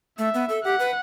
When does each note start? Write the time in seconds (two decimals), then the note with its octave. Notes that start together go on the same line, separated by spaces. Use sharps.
0.18 A3 E5
0.34 B3
0.49 A4
0.64 G4 F#5
0.79 B4